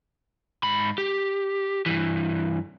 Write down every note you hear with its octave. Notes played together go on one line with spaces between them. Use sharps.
G#2 B5
G4
G2 E3